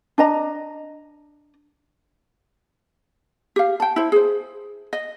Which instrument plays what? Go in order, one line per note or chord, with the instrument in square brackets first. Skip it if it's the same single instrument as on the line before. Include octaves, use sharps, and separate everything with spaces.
[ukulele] D4 D#5 A#5
G4 F5
G5 A5
E4 C5
G#4 C5
D#5